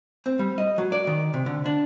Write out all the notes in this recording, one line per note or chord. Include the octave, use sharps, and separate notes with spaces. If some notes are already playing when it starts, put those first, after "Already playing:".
C4
G3
D#5
F#3
D5
D#3
C3
D3
D4